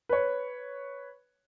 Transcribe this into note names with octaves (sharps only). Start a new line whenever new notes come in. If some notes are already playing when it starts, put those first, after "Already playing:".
B4 C#5